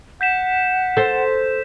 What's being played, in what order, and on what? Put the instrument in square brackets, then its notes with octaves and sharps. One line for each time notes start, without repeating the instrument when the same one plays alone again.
[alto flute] F#5 [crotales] G6 B6 E7
[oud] A4 C5 [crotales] G6